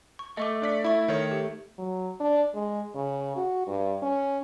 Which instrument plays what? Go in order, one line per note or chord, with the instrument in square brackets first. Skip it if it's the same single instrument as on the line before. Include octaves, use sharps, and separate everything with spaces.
[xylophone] C#6
[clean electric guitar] A3 [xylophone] D#5 C#6 D6
[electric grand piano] D4 D5 B6
[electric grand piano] E4 [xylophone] E5 C#6
[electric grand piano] D#3 C#5
[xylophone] G4
[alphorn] F#3
D4
G#3
C#3
F#4
G2
C#4